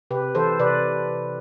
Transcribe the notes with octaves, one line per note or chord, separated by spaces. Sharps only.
C3 G4 B4
E3 A4 C5
C3 B4 D5